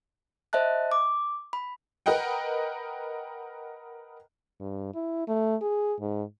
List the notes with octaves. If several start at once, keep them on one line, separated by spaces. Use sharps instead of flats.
C5 D#5 E5 A5 F#6
D6
B5
A#4 B4 D#5 F#5 G5
G2
E4
A3
G#4
G#2